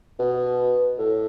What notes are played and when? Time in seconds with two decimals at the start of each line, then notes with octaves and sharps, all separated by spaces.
0.19 B2
0.99 A2